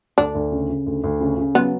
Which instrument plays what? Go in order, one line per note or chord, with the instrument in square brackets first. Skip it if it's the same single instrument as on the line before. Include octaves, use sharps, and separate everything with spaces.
[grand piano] D2 [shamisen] D4
[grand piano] D2
C#3
C#3
D2
D2
C#3
C#3
[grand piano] F#3 [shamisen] B3